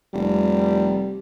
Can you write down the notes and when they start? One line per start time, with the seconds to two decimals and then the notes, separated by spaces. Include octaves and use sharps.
0.13 F1 G3